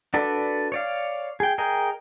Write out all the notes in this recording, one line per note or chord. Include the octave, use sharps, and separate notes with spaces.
D4 F#4 A4 B4 D5
C#5 D5 F5
G#4 G5
G#4 A#4 D#5 G5